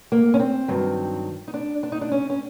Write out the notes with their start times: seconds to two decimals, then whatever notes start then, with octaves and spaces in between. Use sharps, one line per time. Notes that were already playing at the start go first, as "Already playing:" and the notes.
0.12 A#3
0.34 C#4
0.40 C4
0.68 G2 D#3 F#3
1.48 D#4
1.54 D4
1.83 D4
1.92 D#4
2.01 D4
2.12 C#4
2.30 C#4